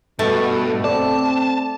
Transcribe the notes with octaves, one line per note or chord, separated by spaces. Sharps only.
G2 B2 A3
C4 A4 D5 A5